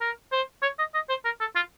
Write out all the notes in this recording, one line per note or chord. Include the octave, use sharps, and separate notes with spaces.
A#4
C5
C#5
D#5
D#5
C5
A#4
A4
F4